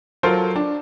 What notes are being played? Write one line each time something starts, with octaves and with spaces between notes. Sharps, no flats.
F#3 F4 A4 A#4 C5
D4